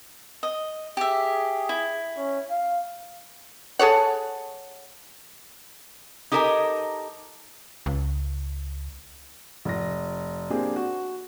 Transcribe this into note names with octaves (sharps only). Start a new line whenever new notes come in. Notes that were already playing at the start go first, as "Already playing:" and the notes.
D#5
G4 G#4 E5
E4
C#4
F5
G#4 A4 C#5 F#5
D#4 G4 A4 A#4 D#5 G#5
C#2
F1 A#6
A#3 C4 D4 G4 G#4
F#4